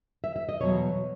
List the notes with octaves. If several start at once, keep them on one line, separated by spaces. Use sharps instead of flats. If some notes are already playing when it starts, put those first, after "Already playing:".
E5
E5
D#5
E2 B2 F#3 C#5